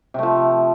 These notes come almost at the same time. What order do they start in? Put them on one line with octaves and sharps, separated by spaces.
C3 A3 F3